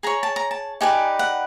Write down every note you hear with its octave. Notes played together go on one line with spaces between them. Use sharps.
G#4 C#5 A#5
A5
A#5
A5
D#4 G4 B4 D5 G#5
F#5